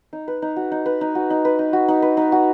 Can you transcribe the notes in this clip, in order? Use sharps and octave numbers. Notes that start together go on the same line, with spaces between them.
D#4
B4
D#4
F#4
D#4
B4
D#4
F#4
D#4
B4
D#4
F#4
D#4
B4
D#4
F#4